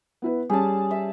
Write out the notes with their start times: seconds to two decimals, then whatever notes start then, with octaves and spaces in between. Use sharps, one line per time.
0.22 B3 E4 B4
0.50 G3 C#4 G#4 A5
0.91 E5